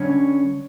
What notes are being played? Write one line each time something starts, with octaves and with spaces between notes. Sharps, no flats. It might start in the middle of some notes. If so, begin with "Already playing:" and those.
Already playing: D3 G3 C#4 C#5